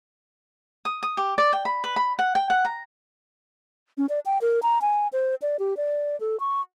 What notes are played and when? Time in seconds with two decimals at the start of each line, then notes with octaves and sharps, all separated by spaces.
0.85 D#6
1.03 D#6
1.17 G4
1.38 D5
1.53 G5
1.65 B5
1.84 B4
1.96 B5
2.19 F#5
2.35 G5
2.50 F#5
2.65 A#5
3.98 C#4
4.09 D5
4.26 G5
4.41 A#4
4.63 A#5
4.81 G#5
5.13 C5
5.42 D5
5.59 G4
5.77 D5
6.20 A4
6.40 C#6